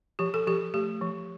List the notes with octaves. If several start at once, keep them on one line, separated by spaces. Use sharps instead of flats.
F3 G4
A4
F3 G4
A3 G4
F3